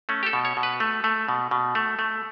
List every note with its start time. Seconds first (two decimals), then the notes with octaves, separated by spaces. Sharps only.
0.09 A3 C#4
0.23 G4
0.26 A4
0.33 B2
0.45 C#5
0.57 B2
0.63 B4
0.80 A3
1.04 A3
1.28 B2
1.51 B2
1.75 A3
1.99 A3